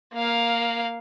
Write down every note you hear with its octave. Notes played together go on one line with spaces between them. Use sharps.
A#3 F5